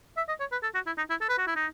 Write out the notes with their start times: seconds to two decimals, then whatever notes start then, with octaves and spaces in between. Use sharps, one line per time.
0.17 E5
0.28 D#5
0.40 C#5
0.52 B4
0.63 A4
0.74 F#4
0.86 E4
0.97 D#4
1.10 E4
1.21 A4
1.29 B4
1.38 F#4
1.47 E4
1.56 D#4